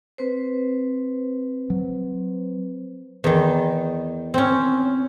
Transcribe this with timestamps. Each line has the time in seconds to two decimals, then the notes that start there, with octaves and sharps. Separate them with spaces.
0.18 C4 B4 C5
1.70 F#3
3.24 E2 D#3
4.34 C4 C#4